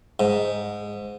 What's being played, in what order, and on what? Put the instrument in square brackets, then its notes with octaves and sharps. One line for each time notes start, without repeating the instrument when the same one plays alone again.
[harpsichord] G#2